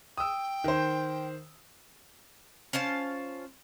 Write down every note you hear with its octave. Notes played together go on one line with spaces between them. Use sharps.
G5 D#6 E6
D#3 C5
C#4 F4 C5 A5